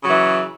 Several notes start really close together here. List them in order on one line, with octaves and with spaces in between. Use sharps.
C#3 F#3 E3